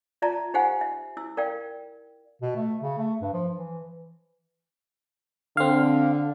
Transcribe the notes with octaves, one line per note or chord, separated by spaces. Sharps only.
F4 D5 E5 A5 A#5
D#4 G4 C5 F5 F#5 G#5
E5
E4 E6
A#4 D5 F5 G5
B2
A3
C#3
A3
G2
F3
E3
D3 C4 F5